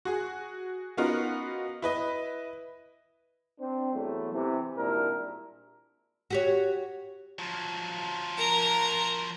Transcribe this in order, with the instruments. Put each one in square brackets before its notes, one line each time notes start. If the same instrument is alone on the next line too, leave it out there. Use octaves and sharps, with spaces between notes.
[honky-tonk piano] F#4 G#4
B3 C#4 D#4 F4 F#4 A#4
E4 B4 D#5
[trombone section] C4 D4 C5
E2 F#3 A3
C3 E3
G#1 A#2 G3 D4 E4 A#4
[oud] F#4 G4 C#5
[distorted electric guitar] F3 F#3
[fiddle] A#4 A#5